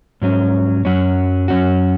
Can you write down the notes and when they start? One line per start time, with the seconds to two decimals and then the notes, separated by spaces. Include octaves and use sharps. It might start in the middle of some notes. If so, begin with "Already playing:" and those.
0.22 G#2 F#3 C#4
0.85 F#2 F#3 C#4 F#4
1.48 F#2 F#3 C#4 F#4